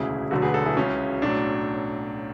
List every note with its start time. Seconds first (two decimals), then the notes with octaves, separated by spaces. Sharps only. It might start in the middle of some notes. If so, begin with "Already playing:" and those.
Already playing: E1 D2 C#3 E4 G#4
0.31 E1 D2 D3 F#3 F#4 A4
0.42 G#4 B4
0.54 F#4 A4
0.66 E4 G#4
0.76 C#2 C#3 F#3 C#4 E4
1.22 B1 A2 F#3 D4